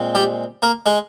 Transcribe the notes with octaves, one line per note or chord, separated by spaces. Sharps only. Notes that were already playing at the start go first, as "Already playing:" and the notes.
Already playing: A#2 G#3 C4
G3 G4
A#3 A#4
G#3 G#4